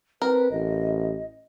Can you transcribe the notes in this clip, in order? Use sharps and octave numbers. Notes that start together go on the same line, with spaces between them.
C4 A#4 B4
A1 D#5